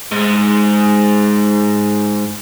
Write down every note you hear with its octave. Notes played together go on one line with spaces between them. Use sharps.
G#2 G#3